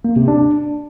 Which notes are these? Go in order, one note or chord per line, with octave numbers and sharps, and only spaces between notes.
A#3
C3
D4